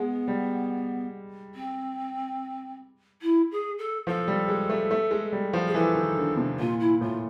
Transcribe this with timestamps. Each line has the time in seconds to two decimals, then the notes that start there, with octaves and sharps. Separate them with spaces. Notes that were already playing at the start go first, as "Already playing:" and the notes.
Already playing: G#3 B3
0.28 G3
1.54 C4
3.22 E4
3.51 G#4
3.78 A4
4.07 F3 A4
4.28 G3
4.48 G#3
4.70 A3
4.91 A3
5.11 G#3
5.32 G3
5.53 F3
5.67 G#4
5.74 E3 A4
5.95 D#3
6.17 D3
6.37 C3
6.59 A#2 F4
6.79 E4
7.01 A2 F4